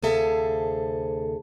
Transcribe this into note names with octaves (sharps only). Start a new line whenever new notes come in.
D2 C3 G#4 A4 E5 F5